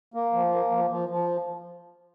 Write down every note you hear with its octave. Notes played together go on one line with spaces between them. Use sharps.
A#3
F3
A#3
F3
F3
F3